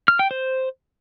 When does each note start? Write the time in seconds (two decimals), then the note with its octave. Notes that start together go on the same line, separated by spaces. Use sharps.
0.08 F6
0.19 G5
0.31 C5